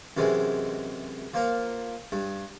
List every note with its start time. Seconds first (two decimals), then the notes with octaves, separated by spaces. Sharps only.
0.17 F#2 C3 E3 G#3
1.34 F3 A#3 A#4
2.12 G2